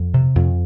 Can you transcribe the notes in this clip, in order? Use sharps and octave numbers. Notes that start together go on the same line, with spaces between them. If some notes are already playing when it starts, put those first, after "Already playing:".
Already playing: F2
C3
F2